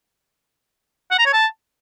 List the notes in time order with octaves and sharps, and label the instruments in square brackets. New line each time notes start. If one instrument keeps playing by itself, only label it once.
[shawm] F#5
A#5
C#5
A5